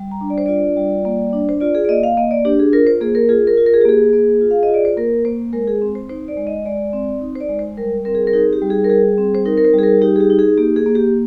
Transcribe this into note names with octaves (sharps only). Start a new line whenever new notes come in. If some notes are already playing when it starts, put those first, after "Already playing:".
Already playing: G3
A#5
D4
D5
C5
F4 D5
G3
A#3
D4
C5
F4 D5
G#4
D5
A#3 D#5
F5
A#3 D#5
D5
D4 G4
G#4
F4 A#4
C5
A#3 G#4
A#4
F4 G#4
A#4
F4
A#4
G#4
G4
A#3 G#4
A#3
F4
F5
D#5
F4
D5
C5
A#3 A#4
A#3 C5
G#3 A#4
G#4
C4
C5
D#4 C5
D5
G#3
D#5
G#3 D5
C4
D#4
C5
D5
G#3
C5
G3 A#4
C4 A#4
G#4
A#4
D#4 G#4
G4
G3
G#4
A#4
G3 G#4
C4
C5
D#4 A#4
A#4
C5
G3
G#4
A#4
D#4 G4
G#4
G4
D#4
G#4
A#3 G4
G#4
A#3
G4